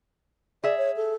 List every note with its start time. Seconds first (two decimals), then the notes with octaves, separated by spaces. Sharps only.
0.64 G#4 D5 E5
0.78 C#5
0.96 A4